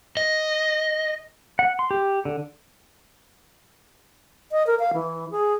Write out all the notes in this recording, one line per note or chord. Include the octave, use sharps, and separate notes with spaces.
D#5
F#5
C6
G4
D3
D#5
A#4
F5
E3
G#4